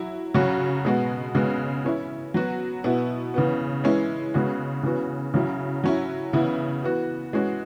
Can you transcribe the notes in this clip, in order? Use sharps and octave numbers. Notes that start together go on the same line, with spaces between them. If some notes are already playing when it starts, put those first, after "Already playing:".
Already playing: F#3 E4
C#3 F#3 C#4 F#4
B2 G#3 B3 F#4
C#3 G#3 B3 F#4
E3 C#4 E4
F#3 B3 F#4
B2 B3 E4
C#3 E3 B3
E3 G#3 C#4 E4
C#3 G#3 B3 F#4
C#3 E3 B3 F#4
C#3 F#3 E4
F#3 C#4 E4
C#3 E3 B3 E4
E3 B3 F#4
E3 G#3 C#4 F#4